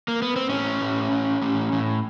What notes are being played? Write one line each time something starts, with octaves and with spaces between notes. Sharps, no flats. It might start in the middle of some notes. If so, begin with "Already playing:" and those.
A#3
B3
C4
A2 C#4
A2
A2
A2
A2